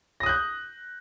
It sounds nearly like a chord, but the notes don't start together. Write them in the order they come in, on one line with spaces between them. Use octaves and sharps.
A#6 D#6 F#6 G6